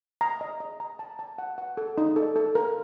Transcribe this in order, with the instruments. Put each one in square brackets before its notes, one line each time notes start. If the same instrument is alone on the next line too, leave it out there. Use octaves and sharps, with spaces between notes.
[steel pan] A#5
D#5
D#5
A#5
A5
A5
F#5
F#5
A4
D#4
A4
A4
A#4